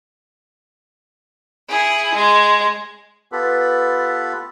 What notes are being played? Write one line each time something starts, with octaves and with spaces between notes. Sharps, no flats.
E4 G#4
G#3
B3 F4 G4 A4 B4 B5